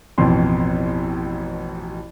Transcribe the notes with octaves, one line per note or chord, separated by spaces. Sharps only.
A1 F2 B2 C6